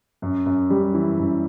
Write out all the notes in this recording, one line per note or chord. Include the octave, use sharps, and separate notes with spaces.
F#2
F#2
G3
E3
F#2